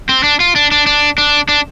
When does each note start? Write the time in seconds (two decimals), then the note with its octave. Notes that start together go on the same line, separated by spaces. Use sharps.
0.09 C4
0.23 D4
0.40 F4
0.56 D4
0.72 D4
0.86 D4
1.18 D4
1.49 D4